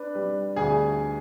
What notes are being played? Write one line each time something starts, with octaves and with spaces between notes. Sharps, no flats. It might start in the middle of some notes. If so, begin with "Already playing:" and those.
Already playing: D4 B4
G3
D2 G#4 G#5